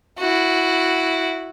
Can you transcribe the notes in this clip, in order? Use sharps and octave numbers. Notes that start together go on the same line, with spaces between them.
E4 F#4